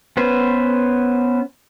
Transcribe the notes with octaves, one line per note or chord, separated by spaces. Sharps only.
B3 C#4 B4 C5